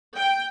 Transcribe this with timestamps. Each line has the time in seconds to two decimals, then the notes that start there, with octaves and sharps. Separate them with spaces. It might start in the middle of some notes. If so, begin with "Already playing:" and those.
0.16 G5